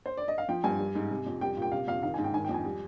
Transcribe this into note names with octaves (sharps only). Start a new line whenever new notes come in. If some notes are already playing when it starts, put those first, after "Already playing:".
C5
D5
D#5
F5
F3 G5
G2 G#5
G3
G#2
C3
F2
G3 G5
A#2
G5
C3 F5
F2 F5
D#3 F5
G#5
G#2
G5
D#3 G#5
G5
F2
G#5
G3